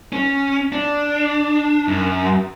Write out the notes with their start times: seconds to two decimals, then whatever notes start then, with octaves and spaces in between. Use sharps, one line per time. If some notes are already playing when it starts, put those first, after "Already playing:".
0.13 C#4
0.72 D4
1.88 F#2